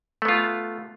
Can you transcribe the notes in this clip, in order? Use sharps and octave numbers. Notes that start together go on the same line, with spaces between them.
A3 B3 F4